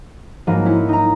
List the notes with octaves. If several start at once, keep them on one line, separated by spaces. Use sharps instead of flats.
G#2 F3 F#3 A#3 B5 D#7
C#4 E4
D#4 A#5